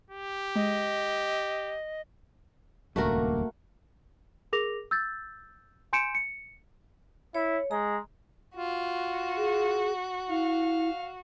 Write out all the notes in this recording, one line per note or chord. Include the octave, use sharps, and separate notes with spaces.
G4
G#3 D#5
D#1 C#2 G2 A3 A#3 F#4 A#4
G#4 A#4 D6 A#6 F7
E6 G6 A6
G#5 C6 G6 C#7 D7 E7
C#7
E4 C#5
G#3 A#5
F4 F#4
G#4
E4 F5